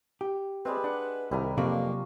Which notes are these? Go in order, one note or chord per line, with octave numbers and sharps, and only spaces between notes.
G4
G3 G#3 C4 B4 E5
D4 F#5
C2 D#3 G3 E4 G#5 A#5
F2 C3 F#3 A#3 D4 F4 D5 C#6